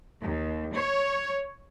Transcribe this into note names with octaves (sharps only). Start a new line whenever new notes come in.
D#2
C#5